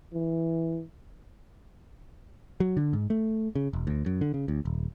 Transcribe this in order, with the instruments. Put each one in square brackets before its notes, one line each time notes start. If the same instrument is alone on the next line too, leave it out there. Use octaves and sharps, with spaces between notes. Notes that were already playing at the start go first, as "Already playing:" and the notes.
[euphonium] E3
[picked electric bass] F#3
D3
G#2
A3
C#3
E1
D2
F#2
D3
C#3
D2
D#1